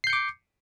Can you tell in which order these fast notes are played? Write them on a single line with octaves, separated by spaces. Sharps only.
C7 G6 C#7 D6